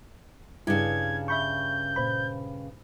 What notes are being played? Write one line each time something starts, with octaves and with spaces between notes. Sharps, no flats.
G2 C#3 E4 G#6
E5 B5 C#6 G6
A#2 C5 B5